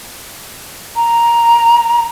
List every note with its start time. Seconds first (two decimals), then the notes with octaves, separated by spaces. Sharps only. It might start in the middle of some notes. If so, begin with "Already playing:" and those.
0.96 A#5